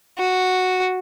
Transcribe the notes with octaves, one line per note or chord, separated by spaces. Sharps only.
F#4